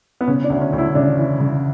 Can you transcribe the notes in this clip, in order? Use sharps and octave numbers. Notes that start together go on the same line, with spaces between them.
B3
C#3 C#4
D4
D2
C#4
D2
E4
C#3 D4
E3
C#3